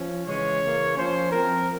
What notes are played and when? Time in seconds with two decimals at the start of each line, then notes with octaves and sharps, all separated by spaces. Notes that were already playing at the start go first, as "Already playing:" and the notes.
Already playing: F3 C#4
0.26 C#3 E3 G#3 C#4 C#5
0.61 C#3 E3 A#3
0.96 F3 A#3 C#4 C5
1.31 F3 C4 A#4